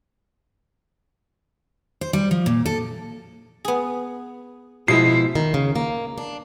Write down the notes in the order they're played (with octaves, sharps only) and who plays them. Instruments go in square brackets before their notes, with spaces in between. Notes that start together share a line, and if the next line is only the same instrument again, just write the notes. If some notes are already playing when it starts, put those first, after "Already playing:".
[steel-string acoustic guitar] C5
G3
F3
A#2
A4
[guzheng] B3 G#4
[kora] B2 F3 G#3 [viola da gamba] E4 [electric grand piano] C7
[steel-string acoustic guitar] D#3
C#3
A#3
D4